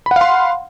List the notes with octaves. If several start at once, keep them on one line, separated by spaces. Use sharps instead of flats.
F5 F#5 B5 C6